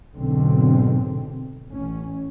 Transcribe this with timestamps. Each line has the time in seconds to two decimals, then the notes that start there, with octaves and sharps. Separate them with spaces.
0.16 B1 G#2 D3 C4
1.70 A1 C#4